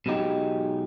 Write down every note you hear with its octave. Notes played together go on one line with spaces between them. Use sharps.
B1 B2 G#3 D#4 G4